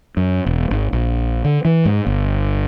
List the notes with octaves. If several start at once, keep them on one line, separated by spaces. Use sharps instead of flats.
F#2
E1
G#1
A#1
D3
E3
G#2
G1